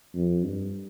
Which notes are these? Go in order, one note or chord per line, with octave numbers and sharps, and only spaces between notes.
F2
G2